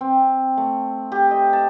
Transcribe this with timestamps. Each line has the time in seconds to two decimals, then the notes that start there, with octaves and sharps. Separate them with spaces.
0.01 C4
0.57 A3
1.12 G4
1.31 D#5
1.53 A5